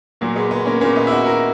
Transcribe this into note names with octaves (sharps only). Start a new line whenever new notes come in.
A#2 F#3 A#3
G#3 B3
G#3 B3
A#3 C#4
A#2 A#3 C#4
B3 D#4
E4
D#4 F#4
F#4 A#4